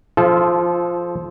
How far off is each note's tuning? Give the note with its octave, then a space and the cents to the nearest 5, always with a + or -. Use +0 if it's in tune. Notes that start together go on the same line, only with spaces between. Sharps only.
F3 +0 F4 -30 A4 -30